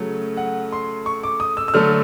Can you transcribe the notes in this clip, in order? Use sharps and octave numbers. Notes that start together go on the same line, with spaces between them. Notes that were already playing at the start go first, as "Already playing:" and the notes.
Already playing: C#3 F#3 A3
F#5
C6
C#6
D6
D#6
E6
E6
D3 F#3 A3 F6